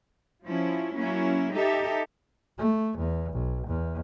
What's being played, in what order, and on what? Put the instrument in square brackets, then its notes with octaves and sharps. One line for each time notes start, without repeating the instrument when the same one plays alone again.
[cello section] F3 C#4 E4
F#3 A#3 C#4 E4
D#4 G4 A4 E5
[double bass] A3
E2
B1
E2